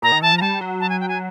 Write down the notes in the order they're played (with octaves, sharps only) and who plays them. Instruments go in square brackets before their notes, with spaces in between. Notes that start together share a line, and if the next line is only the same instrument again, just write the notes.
[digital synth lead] A#2 [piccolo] A#5
[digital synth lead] D#3
[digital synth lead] E3 [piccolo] A5
[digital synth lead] F3
[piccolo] A#5
[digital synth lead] G3 [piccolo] A5
[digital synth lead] F#3
[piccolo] A5
G#5
G5
G#5